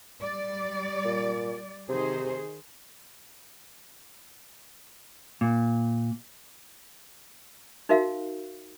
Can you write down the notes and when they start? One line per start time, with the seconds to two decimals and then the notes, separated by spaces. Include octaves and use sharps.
0.22 G3 D5
1.05 A#2
1.89 C3 D#3 G#4 C5
5.41 A#2
7.89 D#4 F#4 A#4 E5 F5